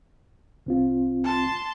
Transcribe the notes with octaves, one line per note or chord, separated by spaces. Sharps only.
C2 C4 F4
A5 C6